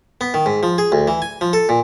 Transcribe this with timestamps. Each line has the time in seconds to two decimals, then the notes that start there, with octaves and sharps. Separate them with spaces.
0.21 B3
0.34 D#3
0.46 G#2
0.63 F3
0.78 G#4
0.92 D2
1.08 E3
1.22 G#5
1.41 F3
1.53 A4
1.69 A#2